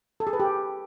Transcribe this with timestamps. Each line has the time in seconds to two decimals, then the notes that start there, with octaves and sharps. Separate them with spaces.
0.20 A4
0.27 G#4
0.33 B4
0.40 G4